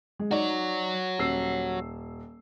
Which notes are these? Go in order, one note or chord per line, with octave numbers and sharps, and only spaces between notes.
G#3
D#4 F#4 C#5 D5
D#1 E6 C7